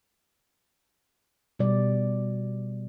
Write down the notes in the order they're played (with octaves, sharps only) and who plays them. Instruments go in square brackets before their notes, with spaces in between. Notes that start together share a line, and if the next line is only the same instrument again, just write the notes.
[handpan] B2 G3 D5